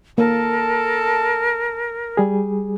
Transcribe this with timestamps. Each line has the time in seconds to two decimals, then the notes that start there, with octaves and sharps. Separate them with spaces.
0.18 A#3 A4 A#4 A5
2.17 G3 G#4